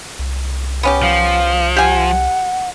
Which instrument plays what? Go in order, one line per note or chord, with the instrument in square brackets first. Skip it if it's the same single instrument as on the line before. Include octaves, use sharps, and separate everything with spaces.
[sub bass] C2
[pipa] B3 C#4 G4
[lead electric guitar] F3 [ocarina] F5
[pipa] G4 G#5 [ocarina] F#5